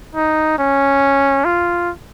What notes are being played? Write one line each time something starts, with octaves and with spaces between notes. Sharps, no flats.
D#4
C#4
F4